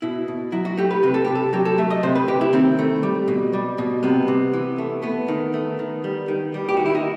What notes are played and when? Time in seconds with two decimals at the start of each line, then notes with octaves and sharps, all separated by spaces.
0.02 B2 E4
0.28 B2
0.52 F#3 E4
0.65 F#4
0.77 A3 G4
0.91 B4
1.03 C3 B4
1.14 A4
1.25 C3 G4
1.35 A4
1.53 F#3 G4
1.65 A4
1.78 A3 E5
1.90 D#5
2.03 C3 C5
2.15 B4
2.28 C3 G4
2.41 E4
2.53 D#3 C4
2.79 A3
3.03 G3
3.28 B2
3.53 G3
3.78 B2
4.03 C3 B3
4.28 C3
4.53 E3
4.78 A3
5.03 A3 B3
5.28 D#3
5.54 A3
5.79 D#3
6.04 G3
6.28 D#3
6.54 G3
6.69 G4
6.77 D#3 F#4
6.86 E4
6.95 D#4